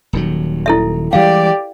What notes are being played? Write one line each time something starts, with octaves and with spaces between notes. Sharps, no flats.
D#1 D#3 F#3
E4 A4 E5
E3 G3 G#3 G4 D5 F5